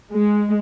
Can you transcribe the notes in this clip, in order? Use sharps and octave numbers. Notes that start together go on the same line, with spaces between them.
G#3